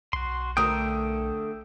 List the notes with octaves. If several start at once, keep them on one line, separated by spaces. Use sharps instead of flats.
B1 F#4 C6
D3 A3 A#4 E5 G5 D#6